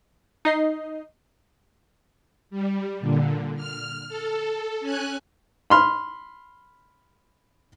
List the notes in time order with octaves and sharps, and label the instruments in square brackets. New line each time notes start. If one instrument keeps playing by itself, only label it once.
[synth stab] D#4 D#5 C7
[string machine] G3
A#2 D3
F6
A4
C#4 G#5 F#6
[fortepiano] B5 C6 F6